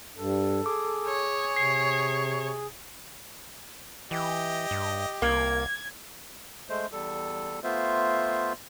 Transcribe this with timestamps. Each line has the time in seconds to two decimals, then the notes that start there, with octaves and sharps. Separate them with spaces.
0.17 G2 A4
0.66 G#4 D6
1.07 C#5
1.56 C3 C7
4.11 E3 G4 D#5
4.71 G2
5.22 C2 A#3 G#6
6.69 G#3 A3 C5
6.92 E2 G3 A4
7.64 A3 B3 F4 C5 E5